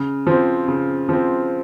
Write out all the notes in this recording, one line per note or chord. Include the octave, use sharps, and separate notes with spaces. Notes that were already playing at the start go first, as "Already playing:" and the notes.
Already playing: C#3
F3 C4
C#3
F3 C4